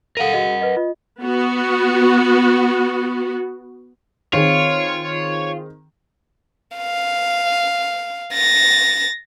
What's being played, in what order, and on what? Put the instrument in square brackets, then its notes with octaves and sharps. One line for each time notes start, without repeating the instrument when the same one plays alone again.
[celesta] A4 F5 D#7 [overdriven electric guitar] A#4 F#5
[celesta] F#4 G#4 D#5
B4 D#5
F4 D#5
[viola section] B3 F#4
[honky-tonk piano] D#3 C4 G#4 [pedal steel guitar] F4 [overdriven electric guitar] C#5
[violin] F5
A6 A#6